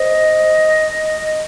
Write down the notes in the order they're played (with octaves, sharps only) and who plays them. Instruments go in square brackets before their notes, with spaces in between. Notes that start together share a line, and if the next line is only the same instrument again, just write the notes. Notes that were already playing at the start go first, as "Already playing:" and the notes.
Already playing: [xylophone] C5 [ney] D#5